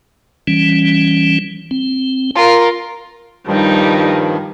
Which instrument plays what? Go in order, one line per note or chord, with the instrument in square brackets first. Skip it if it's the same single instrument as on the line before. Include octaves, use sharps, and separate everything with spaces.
[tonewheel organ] E3 G3 C#4
C4
[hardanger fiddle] F4 A#4
[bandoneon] G2 D#3 F3 [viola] G3 D#4